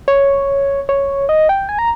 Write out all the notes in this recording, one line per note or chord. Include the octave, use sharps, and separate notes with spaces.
C#5
C#5
D#5
G5
G#5
A#5